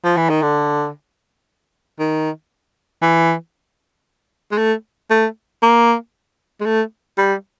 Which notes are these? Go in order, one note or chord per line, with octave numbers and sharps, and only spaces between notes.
F3
E3
D#3
D3
D#3
E3
G#3
A3
A3
A#3
G#3
A3
G3